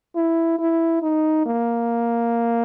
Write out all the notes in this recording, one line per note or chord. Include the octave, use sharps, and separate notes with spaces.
E4
E4
D#4
A#3